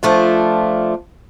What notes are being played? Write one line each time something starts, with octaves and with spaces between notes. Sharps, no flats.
F3 A3 D4 F4